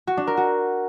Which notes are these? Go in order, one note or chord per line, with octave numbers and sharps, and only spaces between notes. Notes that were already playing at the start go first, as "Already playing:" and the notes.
F#4
D4
A#4
F#4